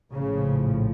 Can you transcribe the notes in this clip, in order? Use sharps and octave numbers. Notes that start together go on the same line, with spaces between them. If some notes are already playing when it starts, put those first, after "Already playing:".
A#1 A2 C#3 F3